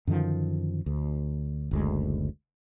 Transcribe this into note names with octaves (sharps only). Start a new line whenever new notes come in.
F#2 D3 D#3 F3
D2
F#1 D2 G#3